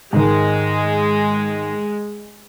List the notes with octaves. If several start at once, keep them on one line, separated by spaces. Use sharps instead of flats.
G#2 D#3 G#3